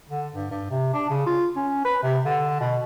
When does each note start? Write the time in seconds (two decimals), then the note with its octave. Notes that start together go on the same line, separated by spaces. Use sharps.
0.09 D3
0.34 G2
0.51 G2
0.70 C3
0.93 D4
1.09 C#3
1.26 F4
1.56 C#4
1.85 B4
2.03 C3
2.25 D3
2.60 B2